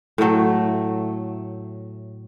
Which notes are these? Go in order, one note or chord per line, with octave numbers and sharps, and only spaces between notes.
A2 F#3 A3